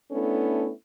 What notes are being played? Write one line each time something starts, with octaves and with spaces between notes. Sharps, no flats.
A3 B3 C#4 D4 E4 A4